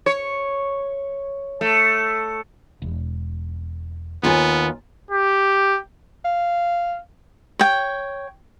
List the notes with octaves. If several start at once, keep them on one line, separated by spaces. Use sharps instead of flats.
C#5
A3
E1
D#2 B3 F4 G#5
G4
F5
C#5 G5